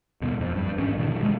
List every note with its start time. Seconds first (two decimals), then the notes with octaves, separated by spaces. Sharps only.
0.22 D#2 B2
0.40 F2
0.55 G2
0.77 G#1 E2 C#4
0.98 B2 D3 D#3
1.20 G2 B2 G#3